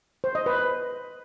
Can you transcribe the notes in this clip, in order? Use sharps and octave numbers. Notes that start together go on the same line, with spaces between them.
C5
D#5
B4